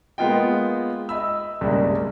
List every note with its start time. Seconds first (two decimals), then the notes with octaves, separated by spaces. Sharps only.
0.18 G#3 A#3 B3 F4 D#5 G5
1.09 D#5 E5 B5 E6
1.61 C2 G2 C#3 G3 G#3 A#3